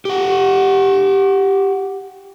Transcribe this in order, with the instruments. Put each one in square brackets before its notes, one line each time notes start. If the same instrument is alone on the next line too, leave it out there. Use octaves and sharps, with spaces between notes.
[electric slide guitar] G4 F#5